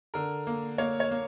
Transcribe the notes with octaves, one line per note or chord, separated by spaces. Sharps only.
D3 A#4
A#3
A#3 C#5
C#5
A#3